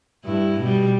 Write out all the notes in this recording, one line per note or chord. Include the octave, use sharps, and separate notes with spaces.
G2 E4
B2 G3